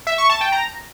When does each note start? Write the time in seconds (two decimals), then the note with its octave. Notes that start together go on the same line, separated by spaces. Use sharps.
0.07 E5
0.18 C#6
0.29 A5
0.41 G5
0.52 A#5